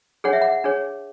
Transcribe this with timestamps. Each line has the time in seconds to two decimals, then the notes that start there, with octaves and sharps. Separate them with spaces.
0.24 D4 G#4 C#5 F#5
0.33 E5
0.42 F#5
0.64 D4 G#4 C#5